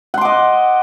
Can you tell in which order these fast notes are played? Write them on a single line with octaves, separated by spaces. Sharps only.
F#5 C6 D6 D#5